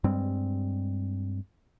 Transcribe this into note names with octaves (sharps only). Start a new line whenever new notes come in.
G2 G3 G#3 C4